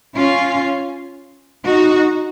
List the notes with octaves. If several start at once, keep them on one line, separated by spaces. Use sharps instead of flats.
C#4 F4
D#4 F#4